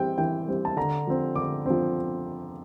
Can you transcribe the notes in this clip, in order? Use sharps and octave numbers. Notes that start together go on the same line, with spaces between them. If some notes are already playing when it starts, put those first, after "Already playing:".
Already playing: E3 G3 C4 G5
E3 G5
G3 C4
A5
D3 A#5
F3 C4
D3 D6
F3 C4